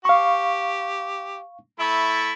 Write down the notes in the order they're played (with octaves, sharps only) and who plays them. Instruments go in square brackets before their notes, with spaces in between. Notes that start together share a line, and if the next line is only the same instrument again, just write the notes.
[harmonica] G4 [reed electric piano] F5 C#6
[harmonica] A3 E4 B5